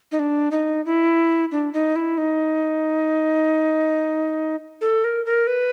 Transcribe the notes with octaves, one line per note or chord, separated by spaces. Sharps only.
D#4
D4
D#4
E4
D4
D#4
E4
D#4
A4
A#4
A#4
B4